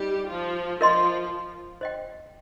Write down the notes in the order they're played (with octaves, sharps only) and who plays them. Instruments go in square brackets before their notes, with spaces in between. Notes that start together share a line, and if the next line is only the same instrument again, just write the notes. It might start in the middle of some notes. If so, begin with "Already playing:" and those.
Already playing: [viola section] G3 G4 [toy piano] D#4 C5 D#5
[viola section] F3 F4
[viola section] F3 F4 [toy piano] A#4 D#5 C6
[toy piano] C5 D#5 G5